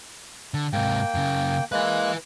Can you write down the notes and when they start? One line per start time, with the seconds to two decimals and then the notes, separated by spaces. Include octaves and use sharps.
0.54 D3
0.73 G#2 C3 A#3 G5
1.15 F#2 C#3
1.72 G#3 A#3 E4 B4 F#6